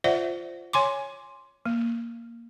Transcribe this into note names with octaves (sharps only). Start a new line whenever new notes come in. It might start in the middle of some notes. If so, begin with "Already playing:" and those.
F4 C5 D5 E5 F#5
C#5 G#5 C6 D6
A#3